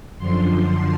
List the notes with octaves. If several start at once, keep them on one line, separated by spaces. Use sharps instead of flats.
F#2 D3 F3 C6
C6